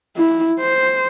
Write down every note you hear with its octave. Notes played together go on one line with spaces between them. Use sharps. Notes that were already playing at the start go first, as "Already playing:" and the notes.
E4
C5